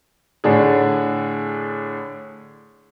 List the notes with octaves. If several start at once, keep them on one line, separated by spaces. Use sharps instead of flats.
A2 D3 D4 G#4